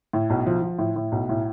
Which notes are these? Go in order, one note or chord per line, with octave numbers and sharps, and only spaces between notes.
A2
B1
F3
F3
A2
A2
B1
A2